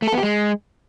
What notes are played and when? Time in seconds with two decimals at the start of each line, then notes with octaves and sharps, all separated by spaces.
0.02 A3
0.07 A4
0.12 B3
0.18 G4
0.23 G#3